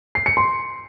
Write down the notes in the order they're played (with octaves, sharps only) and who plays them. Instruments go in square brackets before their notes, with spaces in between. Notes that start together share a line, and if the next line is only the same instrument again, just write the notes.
[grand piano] C7
C#7
C6